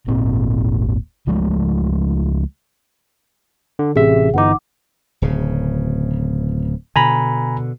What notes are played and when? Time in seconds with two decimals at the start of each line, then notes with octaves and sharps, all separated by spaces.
0.07 D#1 G#1 A#2 C4
1.27 C#2 F3 G#3 A3
3.79 D3
3.96 A1 C3 G#4 E5
4.34 G1 E3 D#4 F#5 D6
5.22 D1 C#3
6.96 B2 D3 G#5 A#5 B5